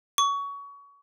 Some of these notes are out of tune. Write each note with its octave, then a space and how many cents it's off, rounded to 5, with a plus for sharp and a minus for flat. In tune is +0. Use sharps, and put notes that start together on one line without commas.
C#6 +25